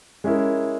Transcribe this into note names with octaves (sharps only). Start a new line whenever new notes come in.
G#3 C#4 E4 A#4